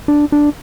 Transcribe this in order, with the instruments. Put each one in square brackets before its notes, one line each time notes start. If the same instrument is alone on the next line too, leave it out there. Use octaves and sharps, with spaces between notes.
[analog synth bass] D4
D4